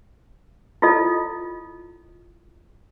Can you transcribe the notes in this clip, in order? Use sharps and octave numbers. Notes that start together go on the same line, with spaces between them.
E4 F4 A4 D#5